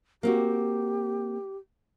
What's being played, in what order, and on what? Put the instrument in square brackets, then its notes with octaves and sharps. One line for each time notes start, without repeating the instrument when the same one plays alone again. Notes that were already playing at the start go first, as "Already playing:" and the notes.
[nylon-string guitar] A#3 C4 F#4 [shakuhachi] G4